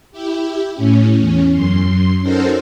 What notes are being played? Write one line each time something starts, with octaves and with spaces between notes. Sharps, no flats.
E4 G4
A2 C#4
E2 C#4
F#2 C6
C#4 D#4 F#4 A4 A#4 C5